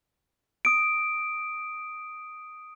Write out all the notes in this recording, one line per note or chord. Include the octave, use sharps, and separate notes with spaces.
D#6 D7